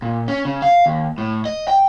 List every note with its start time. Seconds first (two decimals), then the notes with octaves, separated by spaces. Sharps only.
0.02 A#2
0.28 C#4
0.45 C#3
0.62 F5
0.86 D#2
1.18 A2
1.45 D#5
1.68 G5